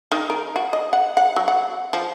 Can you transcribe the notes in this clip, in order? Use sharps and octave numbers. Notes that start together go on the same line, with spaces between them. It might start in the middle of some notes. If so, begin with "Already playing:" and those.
D#3
A#4
F#4
D#5
F#5
F#5
F#3
F#5
F3